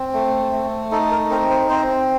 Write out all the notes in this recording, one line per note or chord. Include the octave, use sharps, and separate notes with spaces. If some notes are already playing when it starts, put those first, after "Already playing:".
Already playing: C4
A3
A3
D#4 A4
A#4
C4 A#4
C5
C4 C5